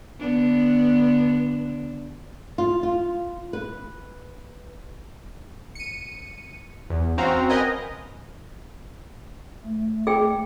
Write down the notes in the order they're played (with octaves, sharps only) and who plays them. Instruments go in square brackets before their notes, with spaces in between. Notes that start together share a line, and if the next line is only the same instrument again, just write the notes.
[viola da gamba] D3 B3 D4
[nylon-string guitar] F4
F4
B4
[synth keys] C#7 D#7
E2
C4 C#4 F#4 F5 A#5
A#4 B4 D#5 G5 G#5 A#5
[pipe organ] A3
[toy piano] G#4 G5